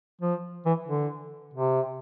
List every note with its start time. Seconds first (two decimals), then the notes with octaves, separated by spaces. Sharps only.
0.21 F3
0.66 E3
0.88 D3
1.54 C3